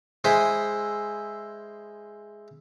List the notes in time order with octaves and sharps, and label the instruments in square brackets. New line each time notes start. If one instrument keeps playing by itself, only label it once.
[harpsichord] G#3 E4 C5 E5 G#5